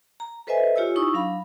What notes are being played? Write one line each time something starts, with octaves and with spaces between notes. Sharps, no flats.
A#5
A4 B4 C5 D#5 E5 G#5
F4 G4 C#5 G#5 E6
D#4 E4 C#6 D#6 E6
F#3 D4 F5 B5